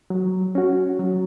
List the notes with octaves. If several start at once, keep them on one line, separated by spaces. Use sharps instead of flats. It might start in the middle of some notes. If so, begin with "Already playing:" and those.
F#3
C#4 F#4
F#3